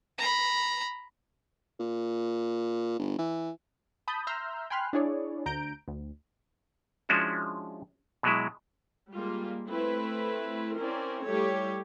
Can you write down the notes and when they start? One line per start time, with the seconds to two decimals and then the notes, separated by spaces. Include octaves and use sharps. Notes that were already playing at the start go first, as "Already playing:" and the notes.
0.18 A#5 B5
1.80 A#2
2.99 G1
3.19 E3
4.08 A5 B5 D#6 G6
4.27 E5 A#5 C6 E6 F6 G6
4.70 G5 G#5 B5 C6 F6 F#6
4.93 D4 E4 G#4 C#5 D5
5.46 D2 A#5 G6 D7
5.88 D2
7.09 F3 G#3 C#4 D4 E4 F#4
8.23 B2 F#3 G#3 E4
9.12 G3 G#3 A#3 F4
9.69 A3 C4 E4 B4
10.78 C4 C#4 E4 A#4 D5
11.23 G3 A3 E4 G4 A4 C#5